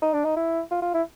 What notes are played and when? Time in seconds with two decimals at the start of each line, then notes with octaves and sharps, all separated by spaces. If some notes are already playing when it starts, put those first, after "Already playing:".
0.02 D#4
0.14 D4
0.25 D#4
0.37 E4
0.71 F4
0.82 F4
0.94 E4